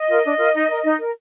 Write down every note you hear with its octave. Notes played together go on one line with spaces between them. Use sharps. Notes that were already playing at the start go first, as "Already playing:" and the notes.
Already playing: D#5
F4 A#4
D4
F4 A#4
D#4
A#4
D#4
A#4